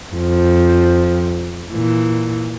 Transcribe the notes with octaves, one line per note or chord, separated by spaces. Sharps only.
F2 F3
A#2 E3